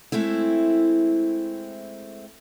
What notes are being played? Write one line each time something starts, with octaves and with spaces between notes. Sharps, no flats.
G#3 A3 C4 E4